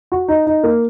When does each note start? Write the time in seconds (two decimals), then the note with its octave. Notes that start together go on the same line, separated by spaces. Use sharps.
0.12 F#4
0.28 D#4
0.46 D#4
0.64 A#3